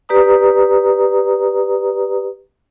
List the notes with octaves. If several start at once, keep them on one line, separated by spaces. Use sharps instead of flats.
G4 B4 D5 A#5 D#6